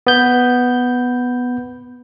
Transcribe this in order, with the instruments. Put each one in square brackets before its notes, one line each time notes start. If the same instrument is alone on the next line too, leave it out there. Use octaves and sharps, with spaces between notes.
[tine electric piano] B3 G6